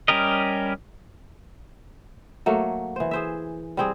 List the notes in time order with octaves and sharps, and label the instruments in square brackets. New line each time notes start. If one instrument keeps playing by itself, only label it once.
[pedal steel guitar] G3 C#4 G4 A#4 D#5
[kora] F#3 A3 A#3
E3 C5
G#4 C5 E5
G3 C4 G#4